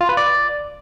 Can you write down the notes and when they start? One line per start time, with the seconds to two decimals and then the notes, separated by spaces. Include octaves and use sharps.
0.01 F4
0.09 B4
0.17 D5